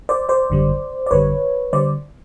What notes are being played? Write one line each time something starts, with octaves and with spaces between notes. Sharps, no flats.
C5 D5
C5 D5
G#1 F#2 D3 G3
D5
G#1 F#2 D3 G3 B4 C#5
D3 G3 C5 D5